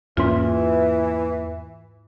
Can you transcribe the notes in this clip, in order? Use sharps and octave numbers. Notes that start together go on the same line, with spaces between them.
E2 G#2 E3 A#3 C#4 F4